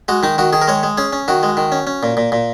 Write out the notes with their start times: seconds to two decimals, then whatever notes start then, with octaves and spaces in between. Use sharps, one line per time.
0.08 G#3 F#4
0.23 D#3 D#4
0.38 D#3 F#4
0.53 D#3 G#4
0.62 A#4
0.68 G#3 C#5
0.83 G#3
0.98 C#4 G#4
1.13 C#4
1.28 D#3 F#4
1.43 G#3
1.57 D#3
1.72 C#4
1.87 C#4
2.03 A#2
2.17 A#2
2.32 A#2